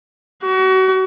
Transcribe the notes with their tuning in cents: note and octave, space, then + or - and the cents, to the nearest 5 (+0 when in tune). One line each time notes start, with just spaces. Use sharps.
F#4 +30